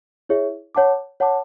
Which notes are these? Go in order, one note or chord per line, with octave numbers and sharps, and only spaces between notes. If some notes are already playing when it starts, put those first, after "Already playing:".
E4 G#4 C#5 E5
C#5 F#5 A5 D6
C#5 F#5 A5 D6